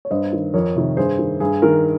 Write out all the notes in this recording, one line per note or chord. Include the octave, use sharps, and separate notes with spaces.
C#5
G2 C5 D#5
D#3
F2 A#4 C#5
C3 D#3
G2 G#4 C5
D#3
G2 G#4
D#3 A#4